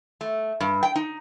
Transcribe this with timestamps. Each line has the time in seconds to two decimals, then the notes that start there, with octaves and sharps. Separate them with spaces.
0.21 A3
0.60 G2
0.83 G5
0.95 D#4